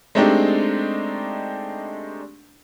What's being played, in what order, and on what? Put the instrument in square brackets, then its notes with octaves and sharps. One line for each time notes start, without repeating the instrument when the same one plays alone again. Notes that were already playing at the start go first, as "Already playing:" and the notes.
[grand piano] G#3 A3 C4 D4 D#4 G4